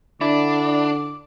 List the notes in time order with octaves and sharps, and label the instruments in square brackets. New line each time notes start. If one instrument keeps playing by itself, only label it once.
[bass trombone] D3 [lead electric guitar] D4 [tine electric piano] E4 D5 B5 [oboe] D6